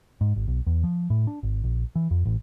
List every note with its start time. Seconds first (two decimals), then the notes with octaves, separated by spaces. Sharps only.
0.21 G#2
0.36 G#1
0.48 B1
0.67 E2
0.84 F3
1.10 A2
1.27 D4
1.43 G#1
1.64 A#1
1.96 E3
2.11 F2
2.26 A1